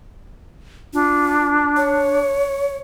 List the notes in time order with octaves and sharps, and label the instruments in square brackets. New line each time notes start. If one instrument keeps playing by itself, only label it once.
[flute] D4 [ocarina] F4
[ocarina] C#5